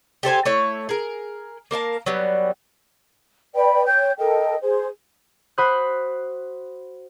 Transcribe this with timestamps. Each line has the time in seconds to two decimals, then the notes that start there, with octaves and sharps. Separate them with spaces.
0.23 G4 A4 C5 G#5
0.45 A3 E4 C#5
0.89 G#4 A#4
1.71 A#3 A#4 F5 A5
2.06 F#3 G3 B3
3.54 B4 D5 G5 B5
3.86 C#5 G5 G6
4.17 A4 A#4 D#5 G5
4.60 G#4 C5
5.58 F#4 C5 B5 C6 D#6 F#6